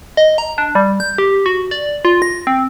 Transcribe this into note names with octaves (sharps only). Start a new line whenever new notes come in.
D#5
A#5
D4
G3
G6
G4
F#4
D5
F4
A#6
C4